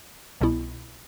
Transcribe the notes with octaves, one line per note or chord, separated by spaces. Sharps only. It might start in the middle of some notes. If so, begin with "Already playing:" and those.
C2 B2 B3 E4